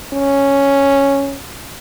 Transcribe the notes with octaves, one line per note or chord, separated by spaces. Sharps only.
C#4